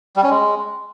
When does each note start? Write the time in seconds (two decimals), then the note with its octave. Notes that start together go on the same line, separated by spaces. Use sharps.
0.16 G3
0.23 C#4
0.30 G#3